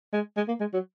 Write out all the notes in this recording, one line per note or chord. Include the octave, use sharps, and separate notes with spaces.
G#3
G#3
A#3
G#3
F#3